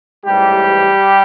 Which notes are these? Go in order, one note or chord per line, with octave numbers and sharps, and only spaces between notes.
A1 G#2 E3 G3 G4